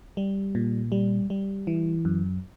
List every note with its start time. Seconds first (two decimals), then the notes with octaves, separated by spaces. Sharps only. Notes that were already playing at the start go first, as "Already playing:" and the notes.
0.17 G3
0.55 A#2
0.92 G3
1.30 G3
1.67 E3
2.05 F#2